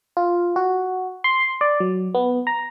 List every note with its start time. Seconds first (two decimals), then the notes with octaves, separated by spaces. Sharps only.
0.17 F4
0.56 F#4
1.24 C6
1.61 D5
1.80 F#3
2.15 B3
2.47 A#5